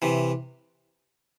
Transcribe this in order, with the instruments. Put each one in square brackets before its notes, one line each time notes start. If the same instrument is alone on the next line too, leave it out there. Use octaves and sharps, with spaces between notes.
[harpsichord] C3 E3